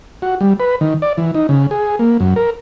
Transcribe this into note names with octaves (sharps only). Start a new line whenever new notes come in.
F#4
G3
B4
D#3
D5
E3
D#4
C#3
G#4
A#3
F#2
A#4